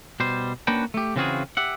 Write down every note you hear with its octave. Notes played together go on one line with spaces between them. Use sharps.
B2 G3 C5
A#3 C#4 D4 F#4 B4 G5
A3 G4
C#3 E3 C4 F4 F#4 G#4
G4 E5 F#5